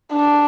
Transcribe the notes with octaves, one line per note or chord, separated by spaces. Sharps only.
D4